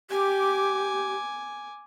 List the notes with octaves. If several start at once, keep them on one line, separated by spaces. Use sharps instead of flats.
G4 G#5 D6